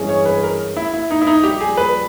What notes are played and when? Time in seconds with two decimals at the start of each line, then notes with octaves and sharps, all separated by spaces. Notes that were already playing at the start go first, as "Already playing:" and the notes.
Already playing: G2 E3 G#3 C#4 G#4
0.09 C#5
0.26 B4
0.43 A#4
0.77 E4
0.94 E4
1.11 D#4
1.22 E4
1.27 A#1 A#2 G3 D#4
1.43 G4
1.61 G#4
1.77 B4